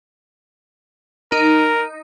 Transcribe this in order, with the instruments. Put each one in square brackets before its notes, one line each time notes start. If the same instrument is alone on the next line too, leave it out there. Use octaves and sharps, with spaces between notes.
[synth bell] D#4 [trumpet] A#4